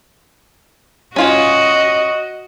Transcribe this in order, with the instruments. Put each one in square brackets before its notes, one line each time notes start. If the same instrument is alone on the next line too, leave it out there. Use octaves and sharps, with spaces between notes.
[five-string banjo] C#4 F4 G#5 [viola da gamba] F#4 D#5